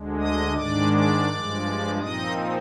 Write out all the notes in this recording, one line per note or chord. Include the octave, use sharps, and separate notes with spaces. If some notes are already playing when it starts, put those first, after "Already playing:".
Already playing: D2 D3 G#3
D#5 D#6
G#2 D#3 G#3 D4 D5 D6
D5 D6
G2 F3 G#3
A#2 F3 C4 D#4 D#5 D#6